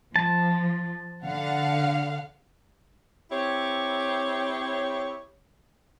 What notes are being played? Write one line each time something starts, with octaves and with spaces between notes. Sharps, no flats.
F3 A5
D3 F5 F#5
C4 E4 G4 C#5